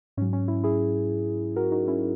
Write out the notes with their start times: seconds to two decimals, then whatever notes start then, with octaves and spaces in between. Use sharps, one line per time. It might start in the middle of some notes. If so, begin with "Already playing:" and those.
0.17 G#2 C#4
0.22 F#3
0.33 C#4
0.48 C#4 E4
0.63 E4 G#4
1.56 F#4 A#4
1.72 D#4 F#4
1.88 C#4 E4